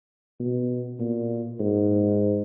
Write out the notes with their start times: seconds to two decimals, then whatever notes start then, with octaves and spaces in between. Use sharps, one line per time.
0.40 B2
1.00 A#2
1.60 G#2